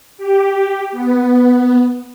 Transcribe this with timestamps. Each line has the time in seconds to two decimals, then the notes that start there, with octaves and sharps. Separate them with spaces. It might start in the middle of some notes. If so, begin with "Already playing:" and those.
0.18 G4
0.92 B3